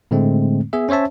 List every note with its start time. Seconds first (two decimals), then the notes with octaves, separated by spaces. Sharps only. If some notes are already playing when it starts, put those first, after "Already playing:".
0.11 A2 D3 G#3 A3 C4
0.73 B3 G#4 E5
0.89 C#4 C5 C#5 E5 A5